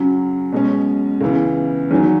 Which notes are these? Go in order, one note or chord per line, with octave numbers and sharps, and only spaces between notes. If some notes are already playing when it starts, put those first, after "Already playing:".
Already playing: F#2 C#3 F#3
B2 G#3 C#4
C#2 C#3 E3 B3
E2 D#3 F#3